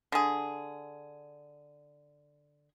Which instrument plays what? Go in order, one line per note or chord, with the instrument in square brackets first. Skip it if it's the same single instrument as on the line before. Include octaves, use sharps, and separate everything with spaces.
[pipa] D3 G#4